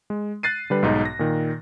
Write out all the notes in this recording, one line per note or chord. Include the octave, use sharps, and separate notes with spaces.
G#3
F#6 A6 C7 D#7
D3 G3 B4
B1 G#2 D#4
A#6
A#2 D#3